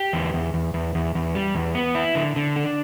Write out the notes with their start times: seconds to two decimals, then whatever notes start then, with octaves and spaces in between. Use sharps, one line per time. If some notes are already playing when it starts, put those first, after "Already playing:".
Already playing: G4
0.13 E2
0.34 E2
0.54 E2
0.74 E2
0.95 E2
1.15 E2
1.35 G3
1.55 E2
1.75 B3
1.95 E4
2.15 D3
2.36 D3
2.56 D4